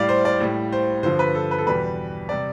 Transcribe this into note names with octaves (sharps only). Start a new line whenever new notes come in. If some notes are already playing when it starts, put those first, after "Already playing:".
Already playing: A2 G3 D5 F5
C5
D5
A2 G3
C5
G2 D3 F3 C5
B4
A4
B4
A4
E2 B2 G3 B4
C3 G3 D5